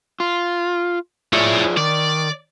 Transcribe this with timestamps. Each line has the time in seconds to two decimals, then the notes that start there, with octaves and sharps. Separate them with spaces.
0.20 F4
1.33 E4 F4 G#4 C#5 D5
1.77 D#3 D5